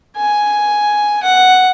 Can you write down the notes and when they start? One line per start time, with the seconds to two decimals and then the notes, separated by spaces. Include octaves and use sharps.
0.17 G#5
1.23 F#5